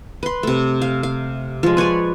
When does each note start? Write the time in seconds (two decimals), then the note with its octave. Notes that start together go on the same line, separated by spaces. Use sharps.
0.23 B4 C6
0.43 C3 A3
0.82 F5
1.03 F5
1.63 F3 G#3
1.77 B4 C#5 D5 G#5